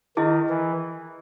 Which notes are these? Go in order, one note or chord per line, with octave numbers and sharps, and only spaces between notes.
D#3 E4 G#4 D#5
E3